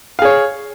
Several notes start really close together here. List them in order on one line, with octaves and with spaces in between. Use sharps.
F5 G#4 C#5